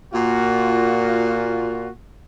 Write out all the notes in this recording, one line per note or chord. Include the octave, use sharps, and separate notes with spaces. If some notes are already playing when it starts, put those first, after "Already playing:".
A#2 F4 F#4